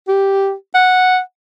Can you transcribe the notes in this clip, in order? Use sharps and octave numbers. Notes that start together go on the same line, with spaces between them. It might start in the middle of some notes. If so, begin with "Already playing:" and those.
G4
F#5